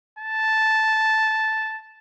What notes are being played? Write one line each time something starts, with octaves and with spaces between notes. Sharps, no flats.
A5